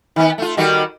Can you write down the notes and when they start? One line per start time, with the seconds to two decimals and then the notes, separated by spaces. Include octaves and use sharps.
0.16 D#3 B3
0.38 A3 F4
0.57 D#3 G3 F#4